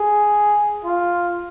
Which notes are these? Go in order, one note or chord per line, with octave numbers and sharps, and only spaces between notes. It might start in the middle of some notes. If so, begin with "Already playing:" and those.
Already playing: G#4
F4